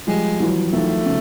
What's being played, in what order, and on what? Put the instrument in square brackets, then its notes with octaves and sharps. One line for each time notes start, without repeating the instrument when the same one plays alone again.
[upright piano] F3 G3 [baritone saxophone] G#3
[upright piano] E3 F#3
[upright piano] D#3 F3 [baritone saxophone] A3
[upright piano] C#3